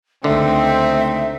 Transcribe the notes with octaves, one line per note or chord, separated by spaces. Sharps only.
C#2 D3 A3 C4 D#4 E5